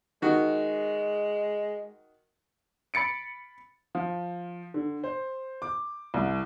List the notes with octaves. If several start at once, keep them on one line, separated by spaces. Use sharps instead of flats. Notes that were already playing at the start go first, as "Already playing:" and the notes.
D#3 G#3 F#4
B5 A6 C#7 D7
F3
D3
C5
D6
C2